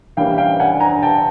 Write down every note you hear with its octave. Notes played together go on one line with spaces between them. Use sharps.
E3 G3 A#3 C#4 F5 G5
F5 G5
F#5 G#5
G#5 A#5
G5 A5